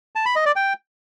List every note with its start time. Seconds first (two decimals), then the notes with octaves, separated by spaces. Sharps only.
0.16 A5
0.26 B5
0.36 D#5
0.46 D5
0.56 G5